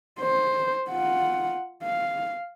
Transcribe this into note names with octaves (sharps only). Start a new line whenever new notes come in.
C5
F4 F#5
F5